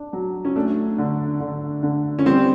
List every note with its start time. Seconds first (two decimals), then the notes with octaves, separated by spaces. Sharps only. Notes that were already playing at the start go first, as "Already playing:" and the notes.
Already playing: D4
0.13 F#3
0.45 C#4
0.56 A3 D4
0.98 D3
1.40 D3
1.83 D3
2.19 C#4
2.26 G3 C4